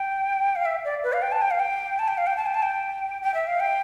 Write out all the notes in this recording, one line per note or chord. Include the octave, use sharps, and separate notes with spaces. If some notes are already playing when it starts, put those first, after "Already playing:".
Already playing: G5
F5
E5
D5
B4
F5
G5
A5
G5
F5
G5
A5
G5
F5
G5
A5
G5
A5
G5
G5
E5
F5
G5